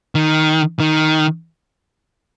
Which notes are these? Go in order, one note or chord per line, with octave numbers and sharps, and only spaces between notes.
D#3
D#3